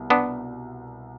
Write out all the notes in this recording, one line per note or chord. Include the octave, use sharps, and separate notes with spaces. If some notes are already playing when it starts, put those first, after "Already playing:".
Already playing: C2 B2
B3 D4